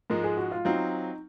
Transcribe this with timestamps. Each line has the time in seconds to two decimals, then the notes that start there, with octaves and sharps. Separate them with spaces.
0.10 G#2 F3 G#3 A#4
0.24 G#4
0.37 F#4
0.52 F4
0.65 F#3 C4 D#4 F4